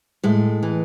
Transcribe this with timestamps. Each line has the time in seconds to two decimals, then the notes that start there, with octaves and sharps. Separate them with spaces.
0.24 A2 G#3
0.63 E3